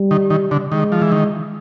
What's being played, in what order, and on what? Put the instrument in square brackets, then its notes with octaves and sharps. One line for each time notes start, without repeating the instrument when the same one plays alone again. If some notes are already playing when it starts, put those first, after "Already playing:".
Already playing: [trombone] G3
[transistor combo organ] D#3
D#3
D3
[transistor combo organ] D#3 [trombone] G#3
[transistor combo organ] F3
E3
D#3